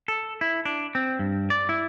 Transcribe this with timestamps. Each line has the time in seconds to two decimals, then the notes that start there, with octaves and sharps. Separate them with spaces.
0.08 A4
0.41 E4
0.65 D4
0.95 C4
1.19 G2
1.50 D5
1.69 E4